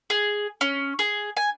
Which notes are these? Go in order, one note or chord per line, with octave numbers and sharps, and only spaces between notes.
G#4
C#4
G#4
G#5